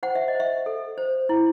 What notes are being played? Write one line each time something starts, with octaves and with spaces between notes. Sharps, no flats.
C5 F#5
E5
D#5
C5
E5
A4
C5
E4